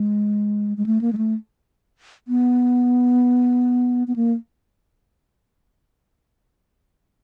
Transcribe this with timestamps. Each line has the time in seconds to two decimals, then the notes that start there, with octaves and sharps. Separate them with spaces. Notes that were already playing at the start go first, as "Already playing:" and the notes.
Already playing: G#3
0.77 G#3
0.86 A3
1.01 A#3
1.13 G#3
1.17 A3
2.28 B3
4.08 B3
4.16 A#3